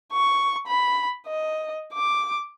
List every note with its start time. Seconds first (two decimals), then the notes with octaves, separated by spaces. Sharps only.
0.13 C#6
0.67 B5
1.27 D#5
1.93 D6